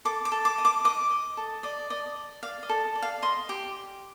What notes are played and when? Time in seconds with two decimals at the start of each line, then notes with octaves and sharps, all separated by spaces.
0.05 A4 D6
0.25 D6
0.32 A4
0.45 D6
0.58 D#5
0.65 D6
0.84 D#5 D6
1.11 D#5
1.37 A4
1.63 D5 D#5
1.90 D5 D#5
2.16 D5
2.43 D5 F5
2.63 D#5
2.69 A4
2.95 D5
3.02 F5
3.22 D#5 C6
3.49 G4